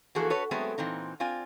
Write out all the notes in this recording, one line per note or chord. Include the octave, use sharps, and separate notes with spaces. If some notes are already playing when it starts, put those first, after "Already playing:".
E3 F3 A#3 F#4 G#4 A4
F#4 A4 B4 C#5
F#3 G#3 A3 B3 C4
A#2 E3 C4 D#4
C4 F4 D5 G#5